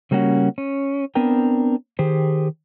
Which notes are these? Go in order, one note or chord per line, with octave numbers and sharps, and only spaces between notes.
C#3 G3 A#3 C#4 F#4
C#4
B3 C4 D4 A#4 G5
D#3 G4 G#4 C5